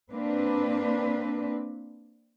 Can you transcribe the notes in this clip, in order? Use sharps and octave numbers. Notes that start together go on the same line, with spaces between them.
A#3 C4 D4 B4